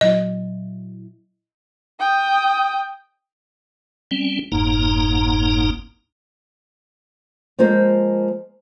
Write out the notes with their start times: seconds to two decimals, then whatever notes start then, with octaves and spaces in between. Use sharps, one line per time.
0.01 A#2 F#3 E4 D#5
2.00 G5 D#6
4.11 G3 C4 C#4
4.52 F#1 F2 G#2 A#3 D#4 A#5
7.58 F3 G#3 A#3 F4 C5